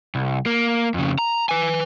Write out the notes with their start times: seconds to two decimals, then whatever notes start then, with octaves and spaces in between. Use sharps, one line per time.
0.15 C2
0.46 A#3
0.94 F2 C#3
1.19 A#5
1.49 B4 G#5